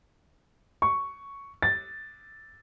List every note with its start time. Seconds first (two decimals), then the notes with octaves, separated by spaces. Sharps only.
0.82 C#6
1.62 A6